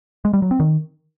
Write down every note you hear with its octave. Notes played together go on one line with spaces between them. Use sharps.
G#3
G3
F#3
C4
D#3